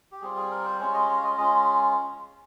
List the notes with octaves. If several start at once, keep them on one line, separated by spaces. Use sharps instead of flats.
G4
G3 C4 F4 G#4
G#4
A#4
C5
G#3 C#4 F4 C#5
D#5
C#5
F5
D#5
G#3 C#4 F4 D#5